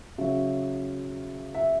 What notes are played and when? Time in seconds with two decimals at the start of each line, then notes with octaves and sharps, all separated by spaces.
0.18 C#3 F#3 E5
1.55 E5